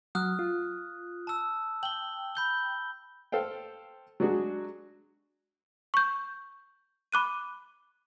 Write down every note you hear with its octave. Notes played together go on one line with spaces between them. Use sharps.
F#3 D#6 F6 F#6
F4
A5 E6
G5 F#7 G7
B5 G6 G7
A4 C5 F5 G5
F#3 G#3 D4 F#4 G#4
C#6 G6
B5 D6 F#6 D#7